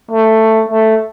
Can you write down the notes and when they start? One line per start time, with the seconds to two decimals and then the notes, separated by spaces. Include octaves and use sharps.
0.11 A3
0.69 A3